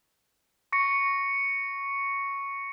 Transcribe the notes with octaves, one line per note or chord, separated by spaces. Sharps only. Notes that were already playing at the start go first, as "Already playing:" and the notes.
C#6 A#6 C#7